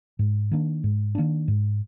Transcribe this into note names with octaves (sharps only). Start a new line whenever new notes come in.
G#2
D#3 A#3 D4
G#2
D#3 A#3 D4
G#2